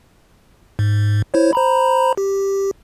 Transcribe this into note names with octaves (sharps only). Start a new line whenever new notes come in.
G#2
E4 C5 C#5
C5 A#5 B5
G4